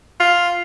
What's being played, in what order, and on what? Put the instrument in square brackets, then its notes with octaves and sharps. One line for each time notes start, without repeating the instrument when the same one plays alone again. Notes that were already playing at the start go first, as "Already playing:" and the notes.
[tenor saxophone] F4